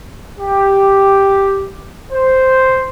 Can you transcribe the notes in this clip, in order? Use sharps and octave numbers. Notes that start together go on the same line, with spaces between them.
G4
C5